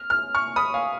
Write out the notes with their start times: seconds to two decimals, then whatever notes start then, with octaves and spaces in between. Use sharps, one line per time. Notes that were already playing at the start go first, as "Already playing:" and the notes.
Already playing: F6
0.10 F6
0.35 C#6 F6
0.56 B5 D#6
0.74 F5 G#5